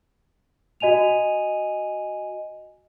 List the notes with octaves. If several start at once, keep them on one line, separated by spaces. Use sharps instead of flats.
F#4 D#5 G#5 D#7 F7